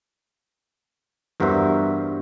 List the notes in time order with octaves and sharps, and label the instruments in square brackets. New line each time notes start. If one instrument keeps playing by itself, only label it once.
[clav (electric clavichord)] E2 G2 F#4 A#4 C5 E5